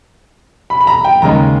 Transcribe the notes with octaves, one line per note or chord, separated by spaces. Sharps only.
B5
B5
A#5
G5
D#2 C#3 G#3 A#5